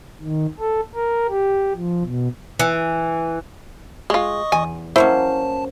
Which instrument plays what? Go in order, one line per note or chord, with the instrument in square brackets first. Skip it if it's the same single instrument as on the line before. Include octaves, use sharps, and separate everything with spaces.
[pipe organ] D#3
A4
A#4
G4
F3
B2
[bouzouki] E3
[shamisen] G#3 F4 [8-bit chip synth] D#5 C#6 D#6
[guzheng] E2 [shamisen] G#5
[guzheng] F#3 A#3 C#4 [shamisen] E4 [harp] C5 [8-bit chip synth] A5